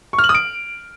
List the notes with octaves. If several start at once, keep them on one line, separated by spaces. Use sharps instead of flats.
C#6
F6
F#7
D#6
D7